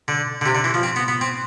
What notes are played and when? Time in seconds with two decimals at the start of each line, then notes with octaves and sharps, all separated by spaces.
0.08 D3
0.41 D3
0.46 C3
0.55 D3
0.64 E3
0.74 F3
0.83 C4
0.96 B3
1.08 B3
1.21 C4